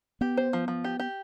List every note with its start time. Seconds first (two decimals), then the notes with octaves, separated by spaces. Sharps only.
0.21 B3 G4
0.37 C5
0.53 F3
0.68 F3
0.84 G4
1.00 G4